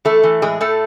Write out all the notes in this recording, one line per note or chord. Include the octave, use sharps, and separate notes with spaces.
E3 A3 A4
E3
A2 G#3 G#4
A2 A3 A4